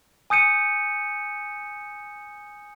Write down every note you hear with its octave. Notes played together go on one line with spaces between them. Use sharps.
G#5 D#6 G6 C#7 D#7